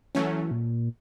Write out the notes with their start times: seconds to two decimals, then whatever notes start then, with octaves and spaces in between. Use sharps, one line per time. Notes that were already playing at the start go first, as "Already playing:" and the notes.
0.15 E3 F#3 A3 C#4
0.51 A#2